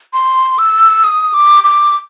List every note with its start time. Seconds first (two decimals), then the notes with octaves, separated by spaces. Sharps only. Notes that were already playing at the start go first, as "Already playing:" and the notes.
0.13 C6
0.59 E6
1.04 D#6
1.34 D6
1.64 D6